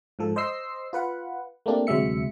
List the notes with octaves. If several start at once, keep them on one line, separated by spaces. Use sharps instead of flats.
G#2 F3 A4
C5 D#5 C6 E6 C7
F4 B4 F#5
A3 A#3 C4 D4 G4
D2 C3 F#3 G#3 E5 C#7